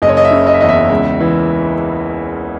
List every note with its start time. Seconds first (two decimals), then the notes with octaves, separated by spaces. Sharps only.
0.02 F#1 D#5
0.09 C#5
0.17 D#5
0.25 E5
0.31 C#3
0.47 D#5
0.54 E5
0.61 E2 D#5
0.69 E5
0.90 C#2
1.20 E3